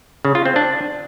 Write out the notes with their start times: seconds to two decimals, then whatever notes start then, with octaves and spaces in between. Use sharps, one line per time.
0.25 C#3
0.35 F4
0.45 C4
0.56 D4